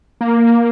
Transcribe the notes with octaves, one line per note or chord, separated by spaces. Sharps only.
A#3